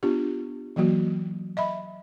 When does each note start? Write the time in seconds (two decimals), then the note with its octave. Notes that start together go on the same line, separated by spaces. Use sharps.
0.03 B3 D4 F4 G4
0.76 E3 F#3 A#3 F#4
1.57 D#5 E5 B5